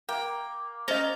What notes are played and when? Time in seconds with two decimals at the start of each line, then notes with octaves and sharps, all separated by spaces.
0.09 A#3 G5
0.88 C#4 C5 D#5 A#5 G6 A6